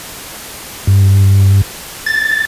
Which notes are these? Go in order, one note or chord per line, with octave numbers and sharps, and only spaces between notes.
G2
A6